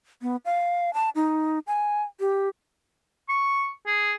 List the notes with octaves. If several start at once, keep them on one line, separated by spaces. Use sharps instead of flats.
B3
F5
A5
D#4
G#5
G4
C#6
G#4